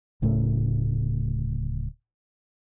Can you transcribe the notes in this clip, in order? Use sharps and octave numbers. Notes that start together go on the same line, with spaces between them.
D1 A2 C#3 A3